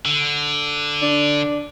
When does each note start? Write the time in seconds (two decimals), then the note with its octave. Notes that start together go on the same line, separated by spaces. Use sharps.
0.06 D3
1.02 D4